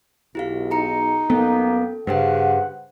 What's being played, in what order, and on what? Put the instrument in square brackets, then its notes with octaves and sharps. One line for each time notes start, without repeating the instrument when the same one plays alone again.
[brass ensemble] B1 [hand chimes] E4 G4 F5
[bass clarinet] D#4 [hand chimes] G#4 A#5 C#7
[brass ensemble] F#2 A#3 G5 [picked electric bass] B3 [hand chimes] A4
[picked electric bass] G2 [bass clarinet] C#3 [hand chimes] B4 C5 G5 [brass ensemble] F#5